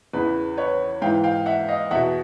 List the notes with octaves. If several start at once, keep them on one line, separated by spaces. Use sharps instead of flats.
E2 C#3 E3 B4
B4 C#5
G#2 E3 F5 G5
F5 G5
E5 F#5
D#5 F5
E2 B2 E5 F#5